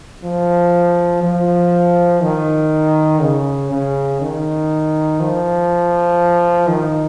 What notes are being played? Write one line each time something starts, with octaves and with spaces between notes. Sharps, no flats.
F3
F3
D#3
C#3
C#3
D#3
F3
D#3